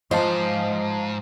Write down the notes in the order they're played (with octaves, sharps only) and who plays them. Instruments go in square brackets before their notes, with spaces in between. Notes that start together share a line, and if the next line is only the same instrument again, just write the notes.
[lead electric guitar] E2 G#2 [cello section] F3 [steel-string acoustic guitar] C5 [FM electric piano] D#5 F5 A5